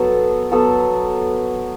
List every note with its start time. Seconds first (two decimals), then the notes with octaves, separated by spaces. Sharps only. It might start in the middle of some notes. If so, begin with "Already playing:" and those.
Already playing: F#3 B3 A4
0.51 F#3 B3 A4